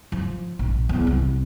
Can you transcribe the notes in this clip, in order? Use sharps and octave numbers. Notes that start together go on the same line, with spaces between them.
F3
A#1
E2
C2